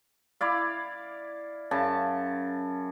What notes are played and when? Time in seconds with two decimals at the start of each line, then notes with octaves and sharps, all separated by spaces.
0.41 E4 D5 F5
1.71 F#2 C#3 A5